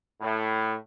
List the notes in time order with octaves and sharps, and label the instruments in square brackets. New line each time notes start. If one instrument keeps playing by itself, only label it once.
[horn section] A2